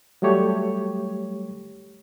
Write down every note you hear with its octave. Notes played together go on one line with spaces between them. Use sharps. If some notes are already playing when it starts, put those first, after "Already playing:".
F#3 G3 A3 G4 C#5